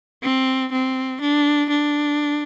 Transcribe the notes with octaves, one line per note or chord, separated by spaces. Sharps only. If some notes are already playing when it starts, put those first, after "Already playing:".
C4
C4
D4
D4